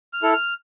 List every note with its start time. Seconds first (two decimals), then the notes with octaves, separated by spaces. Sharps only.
0.13 F6
0.22 E4 A4
0.33 F6